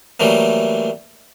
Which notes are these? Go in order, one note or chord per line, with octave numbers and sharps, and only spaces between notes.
E3 F#3 G3 A3 A#3